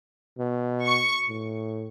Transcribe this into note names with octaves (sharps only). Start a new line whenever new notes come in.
B2
C#6
A2